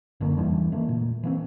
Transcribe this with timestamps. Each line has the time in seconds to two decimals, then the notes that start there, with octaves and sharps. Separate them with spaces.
0.20 F#1 F#2 D3 A#3
0.37 E2 E3 G3 D4
0.72 C#3 E3 A3 A#3
0.89 A#2
1.23 E3 A#3 C4